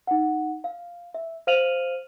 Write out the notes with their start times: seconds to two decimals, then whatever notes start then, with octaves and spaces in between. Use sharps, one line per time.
0.07 D#4 F#5
0.64 F5
1.14 E5
1.47 C5 F5 F6 D#7 F7 F#7